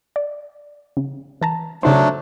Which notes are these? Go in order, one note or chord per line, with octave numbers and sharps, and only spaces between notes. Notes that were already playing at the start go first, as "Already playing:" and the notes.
D5
C#3
E3 A5 A#5
C#3 F#3 A3 D4 D#4 C5